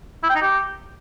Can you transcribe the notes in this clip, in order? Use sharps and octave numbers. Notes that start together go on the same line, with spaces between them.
E4
G5
D#4
G4